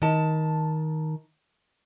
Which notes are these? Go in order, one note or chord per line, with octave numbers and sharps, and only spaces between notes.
D#3 A5